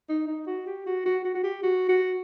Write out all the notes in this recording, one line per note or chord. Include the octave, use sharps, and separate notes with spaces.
D#4
D#4
F#4
G4
F#4
F#4
F#4
F#4
G4
F#4
F#4